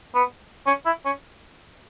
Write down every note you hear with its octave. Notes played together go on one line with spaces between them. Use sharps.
B3
C#4
E4
C#4